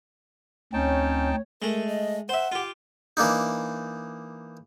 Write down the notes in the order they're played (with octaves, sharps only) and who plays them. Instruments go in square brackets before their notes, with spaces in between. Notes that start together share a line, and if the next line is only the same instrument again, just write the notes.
[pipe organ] D2 C4 [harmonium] C#4 [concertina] D#4 G5 A5 [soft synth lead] C#5
[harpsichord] G#3 A3 [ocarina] A#4
[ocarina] D#5
[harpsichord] C5 E5 [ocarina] F#5
[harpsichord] F4 G4
E3 A#3 D4 D#4